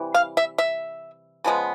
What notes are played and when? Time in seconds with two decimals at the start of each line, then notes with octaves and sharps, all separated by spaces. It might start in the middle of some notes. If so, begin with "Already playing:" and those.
Already playing: C3 E3 G3
0.14 F5
0.37 E5
0.58 E5
1.44 C#3 F3 G#3 B3